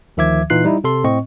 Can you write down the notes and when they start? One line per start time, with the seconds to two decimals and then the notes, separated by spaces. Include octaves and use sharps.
0.17 D2 D#3 F3 E5 D6 G#6
0.50 A#2 E3 D#4 F4 F#6 C7
0.64 G3 D#4 E4
0.84 C3 A4 C6
1.04 A2 C4 D#5 C#6